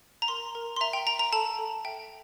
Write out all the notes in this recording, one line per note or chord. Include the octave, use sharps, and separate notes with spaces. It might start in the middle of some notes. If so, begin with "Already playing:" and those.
A#5
A#4 C6
A#4
C6
E5 A#5
G5
G5 A#5
A#5
A4 A5
A4
E5 G5